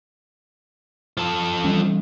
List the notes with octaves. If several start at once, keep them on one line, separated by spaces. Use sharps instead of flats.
F3 A4
E3 G3 C#4